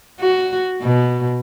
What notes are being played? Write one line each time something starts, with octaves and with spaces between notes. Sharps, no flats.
F#4
B2